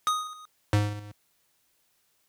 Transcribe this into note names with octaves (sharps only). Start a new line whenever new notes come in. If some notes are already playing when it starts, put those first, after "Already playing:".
D#6
G#2